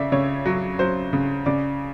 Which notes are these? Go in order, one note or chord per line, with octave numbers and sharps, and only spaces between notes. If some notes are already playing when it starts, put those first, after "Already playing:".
Already playing: C#3 D5 E5
C#3 C#5
F#3
F#3 C5
C#3
C#3 D5